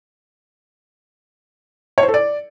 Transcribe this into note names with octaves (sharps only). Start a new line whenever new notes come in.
C#5
C5
A4
D5